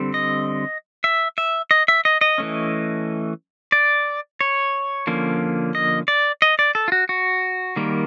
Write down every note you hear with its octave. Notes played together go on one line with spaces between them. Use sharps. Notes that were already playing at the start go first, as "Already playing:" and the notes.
Already playing: D3 G3 C4
D#5
E5
E5
D#5
E5
D#5
D#5
E3 A3 C#4
D5
C#5
D3 F3 A#3 C#4
D#5
D5
D#5
D5
A4
F4
F#4
F#4
D#3 G3 A#3